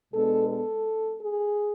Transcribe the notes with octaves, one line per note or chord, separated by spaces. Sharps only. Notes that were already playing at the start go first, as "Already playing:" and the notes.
B2 G#3 B3 D4 A4
A4
G#4